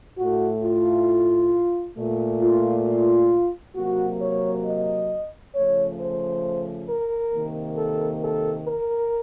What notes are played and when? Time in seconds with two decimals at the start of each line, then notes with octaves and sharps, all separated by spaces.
0.18 A2 A3 F#4
0.64 F4
1.97 A#2 A3
2.41 F4
2.87 F4
3.76 C3 F#3 A#3 F#4
4.21 C#5
4.65 D#5
5.54 C#3 F3 A3 C#5
5.99 C5
6.89 A#4
7.33 C3 D#3 A#3
7.77 A4
8.22 A4
8.67 A#4